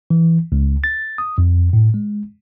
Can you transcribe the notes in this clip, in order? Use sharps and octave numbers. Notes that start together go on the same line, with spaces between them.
E3
C#2
A6
D#6
F2
A2
G#3